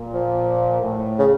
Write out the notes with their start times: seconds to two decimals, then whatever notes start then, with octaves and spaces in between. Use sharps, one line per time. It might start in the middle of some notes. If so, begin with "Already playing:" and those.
Already playing: A#2
0.14 F3
0.81 A2
1.19 C#3